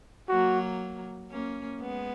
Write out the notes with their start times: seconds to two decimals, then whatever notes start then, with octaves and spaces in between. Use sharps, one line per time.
0.29 F#3 A#3 F#4
1.31 A#3 C#4
1.81 G#3 B3